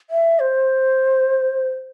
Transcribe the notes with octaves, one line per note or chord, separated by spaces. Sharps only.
E5
C5